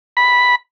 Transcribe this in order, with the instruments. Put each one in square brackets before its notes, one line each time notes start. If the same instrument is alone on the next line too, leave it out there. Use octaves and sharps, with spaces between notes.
[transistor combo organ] B5